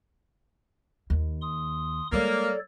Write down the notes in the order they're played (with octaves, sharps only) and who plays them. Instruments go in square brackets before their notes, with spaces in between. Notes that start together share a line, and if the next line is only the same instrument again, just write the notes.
[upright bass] D#2
[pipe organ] C6 D#6
[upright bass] G3 G#3 [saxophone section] A#3 [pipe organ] A4 C#5 D5